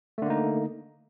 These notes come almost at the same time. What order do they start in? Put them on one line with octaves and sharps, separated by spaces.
A3 D3 A#3 D#4